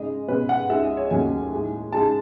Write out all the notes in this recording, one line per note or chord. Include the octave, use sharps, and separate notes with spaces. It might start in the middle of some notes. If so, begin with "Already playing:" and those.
Already playing: C#3 G#3 D#4 D#5
B2 G#3 C#4 B4
F#5
C#2 C#3 G#3 D#4 E5
D#5
C#5
D#2 C#3 F#3 A3 C#4 G#5
A2 G#3 D#4
C#3 G#3 D#4 A5